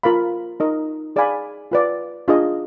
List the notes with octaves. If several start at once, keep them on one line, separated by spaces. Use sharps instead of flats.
F4 A#4 F5 B5
D#4 A#4 D#5
G#4 D5 F5 G#5 B5
F4 B4 D5 F5
D4 F4 G#4 D#5